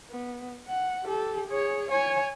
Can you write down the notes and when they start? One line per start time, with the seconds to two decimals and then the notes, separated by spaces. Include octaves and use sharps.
0.10 B3
0.68 F#5
1.05 G4 A4
1.47 G#4 C#5
1.91 C#5 G#5